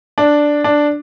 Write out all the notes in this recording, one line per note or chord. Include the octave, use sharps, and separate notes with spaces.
D4
D4